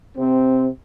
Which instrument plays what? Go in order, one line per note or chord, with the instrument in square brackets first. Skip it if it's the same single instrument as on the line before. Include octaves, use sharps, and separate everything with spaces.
[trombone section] C3 C4